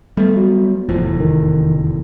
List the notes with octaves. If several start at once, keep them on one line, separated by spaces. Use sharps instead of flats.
G3 A3 B3
F#3
F1 E2 A2 F3
D#3